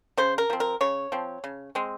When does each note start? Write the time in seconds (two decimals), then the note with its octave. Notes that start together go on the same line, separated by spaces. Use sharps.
0.18 C#3 C5
0.38 A#4
0.50 F3 C4
0.60 A#4
0.81 C#3 C#5
1.12 F3 C4
1.44 C#3
1.75 G#3 C4